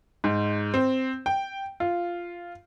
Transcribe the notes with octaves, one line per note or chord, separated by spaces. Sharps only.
G#2
C4
G5
F4